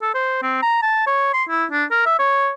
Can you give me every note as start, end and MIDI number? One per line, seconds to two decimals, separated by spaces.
0.02 0.11 69
0.14 0.42 72
0.42 0.61 60
0.63 0.81 82
0.82 1.06 81
1.07 1.29 73
1.34 1.43 84
1.49 1.65 64
1.71 1.84 62
1.91 2.05 70
2.06 2.17 76
2.19 2.51 73